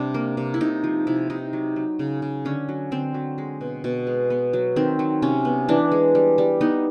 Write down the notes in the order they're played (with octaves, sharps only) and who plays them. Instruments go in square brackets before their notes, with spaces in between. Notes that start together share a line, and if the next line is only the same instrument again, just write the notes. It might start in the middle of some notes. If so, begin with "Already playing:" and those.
Already playing: [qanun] C3 G3 D4
A#3
C3
E4
C3 D#4
F3
C3 E4
C3 D#4
F#3
F#3
C#3
C#3
D3 C#4
F#3
D3 C4
F#3
G#3
B2
B2
G#3
B3
F#3
D#3 C4
F#3
C3 C#4
B3
E3 D4
G#3
G3
G3
B3 D#4